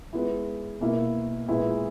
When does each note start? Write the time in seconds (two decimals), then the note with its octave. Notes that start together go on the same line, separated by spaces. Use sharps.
0.13 G#3 B3 E4
0.81 B2 A#3 E4
1.48 A#2 G#3 B3 E4